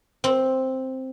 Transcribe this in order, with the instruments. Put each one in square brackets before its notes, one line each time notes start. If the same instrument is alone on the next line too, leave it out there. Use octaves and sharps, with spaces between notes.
[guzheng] C4